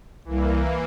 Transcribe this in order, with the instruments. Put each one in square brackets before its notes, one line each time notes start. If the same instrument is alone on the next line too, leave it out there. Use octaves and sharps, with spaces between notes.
[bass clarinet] C2 [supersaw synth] E3 A#3